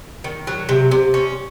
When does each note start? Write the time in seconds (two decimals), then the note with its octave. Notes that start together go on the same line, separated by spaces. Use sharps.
0.24 D#3
0.47 F#3
0.69 C3
0.91 C3
1.14 C#4